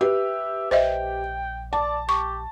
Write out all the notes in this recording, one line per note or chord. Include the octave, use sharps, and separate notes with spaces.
G4 B4 E5
A#1 C5 D#5 E5 G5
D5 A5
G4 C#6